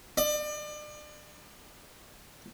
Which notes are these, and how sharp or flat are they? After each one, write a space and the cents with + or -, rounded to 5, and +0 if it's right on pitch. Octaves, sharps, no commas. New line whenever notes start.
D5 +35